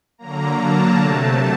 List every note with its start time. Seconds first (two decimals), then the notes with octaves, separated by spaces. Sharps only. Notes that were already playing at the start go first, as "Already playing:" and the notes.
0.18 D3 F#3 A#3 A#5
0.58 A5
0.98 C3 F#3 A3